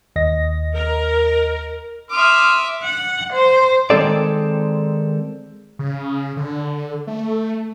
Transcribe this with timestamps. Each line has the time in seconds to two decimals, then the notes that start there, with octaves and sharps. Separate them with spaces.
0.16 D#2 D#5 A#6
0.75 A#4
2.11 E5 C6 D6 D#6 F6
2.83 F#5
3.33 C5
3.90 D#3 G#3 C4 A4 D5
5.79 C#3
6.37 D3
7.07 A3